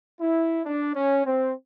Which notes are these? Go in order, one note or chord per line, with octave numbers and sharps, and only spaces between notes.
E4
D4
C#4
C4